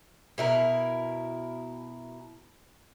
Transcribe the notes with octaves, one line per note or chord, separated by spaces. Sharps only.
B2 E4 A#4